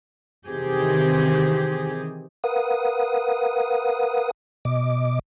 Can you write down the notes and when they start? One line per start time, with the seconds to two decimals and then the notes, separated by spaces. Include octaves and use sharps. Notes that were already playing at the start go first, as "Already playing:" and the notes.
0.47 C3 D#3 E3 C4 G4 G#4
2.44 A#4 B4 F5 F#5 D#6
4.65 B2 D#5 D6